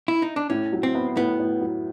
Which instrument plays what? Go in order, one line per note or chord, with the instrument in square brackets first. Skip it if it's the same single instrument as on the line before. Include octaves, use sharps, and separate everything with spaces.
[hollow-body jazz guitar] E4
D#4
D4
[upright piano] A2 [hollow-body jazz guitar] C#4
[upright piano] F#3
[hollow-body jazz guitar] C4
[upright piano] B3
[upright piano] A2 [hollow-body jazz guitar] B3
[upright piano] A2
F#3